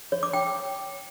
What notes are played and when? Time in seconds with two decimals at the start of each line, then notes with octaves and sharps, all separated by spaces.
0.12 C#5
0.23 D6
0.33 G5